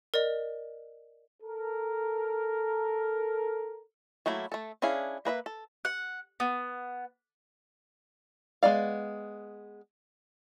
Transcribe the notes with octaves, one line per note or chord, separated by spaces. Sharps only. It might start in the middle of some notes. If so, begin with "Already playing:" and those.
A#4 D5 D#5
A4 A#4
F#3 A3 A#3 E4
A3 A4
C#4 D4 E4 G#4 F5
A#3 B4 D#5 E5
A4
F#5
B3
G#3 B3 D5 F5